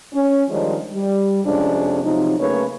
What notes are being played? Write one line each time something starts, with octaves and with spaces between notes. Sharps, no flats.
C#4
D#3 F3 G3 G#3 D4 D#4
G3
F2 C3 G#3 C#4 D4
C3 F3 F#3 D#4
C#3 F#3 A3 A#3 B4 C#5